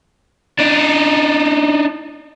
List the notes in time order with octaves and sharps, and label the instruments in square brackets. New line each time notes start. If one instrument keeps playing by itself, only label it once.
[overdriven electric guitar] D4 D#4